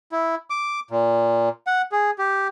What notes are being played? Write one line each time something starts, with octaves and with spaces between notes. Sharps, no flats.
E4
D6
A#2
F#5
G#4
G4